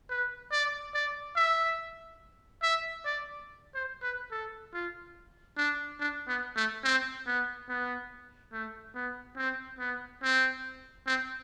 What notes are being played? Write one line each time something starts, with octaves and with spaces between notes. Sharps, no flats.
B4
D5
D5
E5
E5
D5
C5
B4
A4
F4
D4
D4
B3
A3
C4
B3
B3
A3
B3
C4
B3
C4
C4